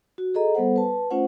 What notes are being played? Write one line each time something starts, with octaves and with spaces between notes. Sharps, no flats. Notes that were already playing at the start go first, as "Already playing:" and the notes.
F#4
G#4 A4 D#5 A#5
G3 B3 A4 C5 F#5
B4 A5
A3 C#4 F4 C5 F#5